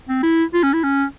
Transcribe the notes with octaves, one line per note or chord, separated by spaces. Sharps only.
C4
E4
F4
C#4
E4
C#4